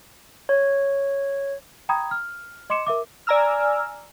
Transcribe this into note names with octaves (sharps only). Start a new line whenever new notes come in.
C#5
G5 A#5 B5 D#6 G#6
F6
D#5 C6 D6 C#7 E7
A#4 E5 D6
D5 G#5 A#5 E6 F6